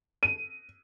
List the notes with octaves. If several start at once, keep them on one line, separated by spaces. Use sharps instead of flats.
D#7